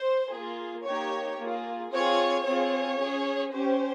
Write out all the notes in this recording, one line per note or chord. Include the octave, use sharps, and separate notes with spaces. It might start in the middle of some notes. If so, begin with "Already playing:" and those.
Already playing: C5
A#3 F4 G#4
A#3 D#4 G4 C#5
A#3 F4 G#4
C4 F4 G#4 C#5
C4 F4 G#4 C#5
C#4 G#4
C#4 G4 C5